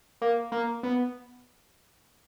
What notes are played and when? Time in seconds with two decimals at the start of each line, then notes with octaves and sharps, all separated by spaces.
0.22 A#3
0.52 A#3
0.83 B3